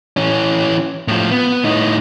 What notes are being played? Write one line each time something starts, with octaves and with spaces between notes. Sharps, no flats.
E3 C#4
A2 F3
B3
A2 D#4